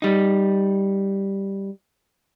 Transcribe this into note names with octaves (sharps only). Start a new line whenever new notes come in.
G3 D#4